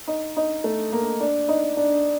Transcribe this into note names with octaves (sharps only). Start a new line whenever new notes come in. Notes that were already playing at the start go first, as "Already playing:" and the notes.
D#4
D#4
A3
A#3
D4
D#4
D4